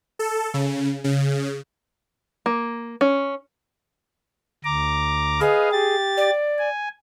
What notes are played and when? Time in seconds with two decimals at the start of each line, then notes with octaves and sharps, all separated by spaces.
0.19 A4
0.54 C#3
1.04 C#3
2.46 A#3
3.01 C#4
4.64 D2 A#5 D6
5.41 G#4 B4 D#5 F5
5.72 G4 A6
6.17 D5
6.58 G#5